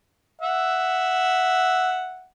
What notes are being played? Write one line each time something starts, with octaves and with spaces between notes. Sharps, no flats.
E5 F#5